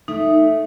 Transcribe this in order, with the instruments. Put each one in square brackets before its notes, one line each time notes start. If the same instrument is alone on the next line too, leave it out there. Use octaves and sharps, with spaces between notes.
[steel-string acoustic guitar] A3 [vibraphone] D#4